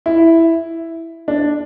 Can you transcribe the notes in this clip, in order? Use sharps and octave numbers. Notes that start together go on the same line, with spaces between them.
E4
D4